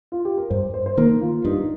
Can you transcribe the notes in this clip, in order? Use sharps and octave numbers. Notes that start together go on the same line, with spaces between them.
F4
G4
A#4
G2 C5
C5
C5
D#3 A#3 A#4
F4
G2 D#4